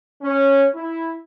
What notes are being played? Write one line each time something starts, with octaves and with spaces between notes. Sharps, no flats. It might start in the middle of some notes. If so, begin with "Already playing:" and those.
C#4
E4